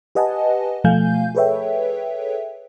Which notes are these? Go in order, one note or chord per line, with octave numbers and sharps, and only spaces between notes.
G4 B4 D#5 F#5 G#5 A5
B2 F3 A3 F5 G#5 G6
G#4 A4 B4 C#5 E5 G5